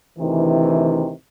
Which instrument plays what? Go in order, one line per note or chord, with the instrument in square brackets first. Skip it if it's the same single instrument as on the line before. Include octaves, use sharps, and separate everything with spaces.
[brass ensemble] D2 C3 D#3 E3